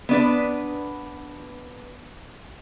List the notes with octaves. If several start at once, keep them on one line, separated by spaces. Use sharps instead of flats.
B3 D4 B4